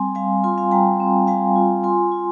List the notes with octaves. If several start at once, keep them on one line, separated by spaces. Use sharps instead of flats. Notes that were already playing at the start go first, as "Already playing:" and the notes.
Already playing: G3 C4 G#5 C6
G3 F5 G#5
F4 G#5 C6
F5 G#5
G3 G5 A#5
C4
G3 F5 G#5
F4
F4 G#5 C6
F4